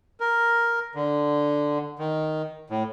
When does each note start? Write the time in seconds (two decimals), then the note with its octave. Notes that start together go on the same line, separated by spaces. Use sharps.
0.20 A#4
0.95 D3
1.99 D#3
2.70 A2